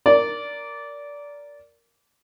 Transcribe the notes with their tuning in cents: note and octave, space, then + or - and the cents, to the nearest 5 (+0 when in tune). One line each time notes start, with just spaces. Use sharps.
A#4 +0 D5 -20